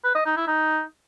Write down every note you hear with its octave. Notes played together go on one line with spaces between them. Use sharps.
B4
D#5
D#4
E4
D#4